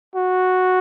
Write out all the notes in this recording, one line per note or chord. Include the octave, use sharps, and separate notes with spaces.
F#4